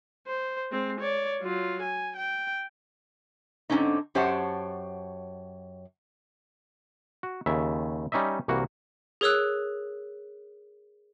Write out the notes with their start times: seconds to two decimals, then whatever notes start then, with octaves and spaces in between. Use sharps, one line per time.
0.27 C5
0.71 G#3 C4
1.01 C#5 D5
1.42 F#3 F4
1.82 G#5
2.16 G5
3.70 G#2 D3 F#3 C4 C#4 D#4
4.15 F#2 G4 C5 C#5 F#5 A5
7.23 F#4
7.46 D#2 C#3 E5
8.12 G3 C#4 D#4 D#5 E5
8.48 C2 E3 A#3 F#4
9.21 G#4 A#4 C#5 D#6 E6 F#6